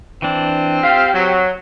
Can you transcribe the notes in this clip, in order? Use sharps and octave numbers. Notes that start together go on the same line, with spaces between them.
E3 C4 D4
F4 G4 F5
F#3